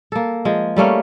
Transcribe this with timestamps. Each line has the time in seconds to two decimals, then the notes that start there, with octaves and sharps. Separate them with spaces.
0.12 A#3 A4
0.45 F3 G#3
0.76 G3 A3 A#3 C#4